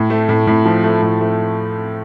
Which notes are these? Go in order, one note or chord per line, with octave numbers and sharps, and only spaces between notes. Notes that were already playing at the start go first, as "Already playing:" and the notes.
Already playing: A2
A3
A2
A2
F3
A3
A2
A3